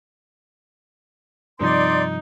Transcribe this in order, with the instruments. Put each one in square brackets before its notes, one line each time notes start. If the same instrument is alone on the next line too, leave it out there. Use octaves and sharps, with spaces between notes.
[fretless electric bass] G2 C3 F3 [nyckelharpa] D#4 [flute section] D5 C6